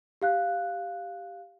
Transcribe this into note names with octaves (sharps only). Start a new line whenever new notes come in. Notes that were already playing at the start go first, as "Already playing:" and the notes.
G4 F5 F#6